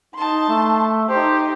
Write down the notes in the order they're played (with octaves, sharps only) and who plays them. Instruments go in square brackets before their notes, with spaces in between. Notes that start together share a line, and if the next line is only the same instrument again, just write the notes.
[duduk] D#4 [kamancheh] A5 C6
[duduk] A3
[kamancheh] D#4 G4 [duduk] C5